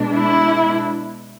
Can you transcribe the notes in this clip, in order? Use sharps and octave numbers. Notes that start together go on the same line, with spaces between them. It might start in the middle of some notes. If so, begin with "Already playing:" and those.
Already playing: B2 G#3 D4
E4